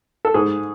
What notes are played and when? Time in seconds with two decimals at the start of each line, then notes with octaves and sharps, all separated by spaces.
0.25 A4
0.34 G#2 G#4